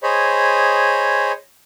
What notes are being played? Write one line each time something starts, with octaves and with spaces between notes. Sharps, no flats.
G#4 C5 C#5 D#5 B5